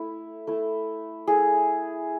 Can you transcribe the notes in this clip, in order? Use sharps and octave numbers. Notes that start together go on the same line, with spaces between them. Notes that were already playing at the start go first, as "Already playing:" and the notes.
Already playing: A3 E4
A3 E4
A3 E4 G#4